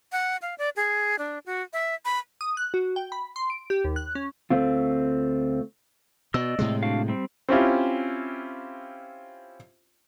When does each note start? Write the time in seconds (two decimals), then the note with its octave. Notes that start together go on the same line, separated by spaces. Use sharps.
0.12 F#5
0.42 F5
0.58 D5
0.76 G#4
1.19 D4
1.46 F#4
1.73 E5
2.05 B5
2.41 D#6
2.57 F#6
2.74 F#4
2.96 G5
3.12 B5
3.36 C6
3.50 D7
3.70 G4
3.84 D#2
3.96 F#6
4.15 C#4
4.50 D2 A3 C4 F4
6.34 B2 D5 D#5 E6
6.59 A2 C3 G#3
6.83 D4 F#4 F5
7.08 G3 C4
7.49 C4 C#4 E4 F4 G4